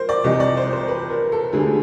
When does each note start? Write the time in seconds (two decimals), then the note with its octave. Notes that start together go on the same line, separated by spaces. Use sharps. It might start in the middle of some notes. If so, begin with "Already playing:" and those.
Already playing: A#4 C5
0.09 D5
0.24 C2 C3 E3 D#5
0.40 D5
0.57 C5
0.73 C5
0.88 B4
1.10 A#4
1.32 A4
1.53 D2 D3 G3 G#4